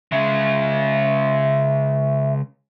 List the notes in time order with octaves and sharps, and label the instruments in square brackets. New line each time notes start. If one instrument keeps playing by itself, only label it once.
[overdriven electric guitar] C#3 G#3 [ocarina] E5